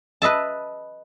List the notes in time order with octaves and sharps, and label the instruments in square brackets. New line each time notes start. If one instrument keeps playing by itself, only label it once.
[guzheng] B4 D#5 E5 A5